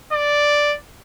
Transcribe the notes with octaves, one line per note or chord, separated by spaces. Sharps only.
D5